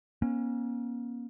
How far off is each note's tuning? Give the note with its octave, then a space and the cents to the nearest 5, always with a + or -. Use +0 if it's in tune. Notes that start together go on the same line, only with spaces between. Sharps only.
A#3 +35 C#4 -20